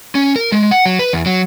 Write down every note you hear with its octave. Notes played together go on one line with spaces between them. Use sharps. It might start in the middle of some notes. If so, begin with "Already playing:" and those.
C#4
A#4
G#3
F#5
F#3
B4
E2
F#3